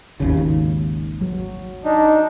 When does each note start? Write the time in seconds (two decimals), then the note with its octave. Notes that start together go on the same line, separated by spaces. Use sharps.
0.20 G#1 D#2 C#3
1.21 F#3
1.84 D4 D#4